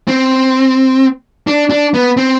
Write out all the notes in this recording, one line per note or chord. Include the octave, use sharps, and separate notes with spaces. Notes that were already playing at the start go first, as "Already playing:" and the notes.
C4
D4
D4
B3
C4